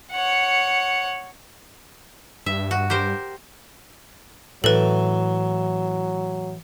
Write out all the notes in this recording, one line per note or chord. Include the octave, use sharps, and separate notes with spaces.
C#5 F#5
G2 E5
F#4
G4 A#4 C5
A2 E3 F#3 A4 B4